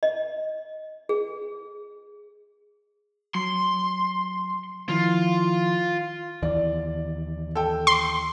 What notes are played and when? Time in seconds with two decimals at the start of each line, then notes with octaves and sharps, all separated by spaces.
0.03 D#5
1.09 G#4
3.35 F#3 C6
4.89 D#3 F3 E4 F4
6.43 D#2 E3 D5
7.55 A4 G5
7.87 C6